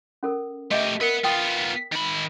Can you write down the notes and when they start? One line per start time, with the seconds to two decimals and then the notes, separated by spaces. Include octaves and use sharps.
0.23 C#4 A4 A#4
0.71 A3 G4 D#5 E5
1.01 A#4 B4 F#5
1.24 B3 F4 G5 D#6
1.92 D#3 B5